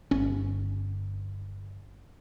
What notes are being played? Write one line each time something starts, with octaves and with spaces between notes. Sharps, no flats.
G1 C#4